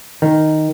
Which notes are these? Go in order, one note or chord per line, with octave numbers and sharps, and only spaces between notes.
D#3